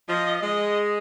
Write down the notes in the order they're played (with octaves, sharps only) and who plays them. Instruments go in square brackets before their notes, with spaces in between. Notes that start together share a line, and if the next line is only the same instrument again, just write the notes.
[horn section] F3 [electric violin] D#5
[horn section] G#3 [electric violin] D#5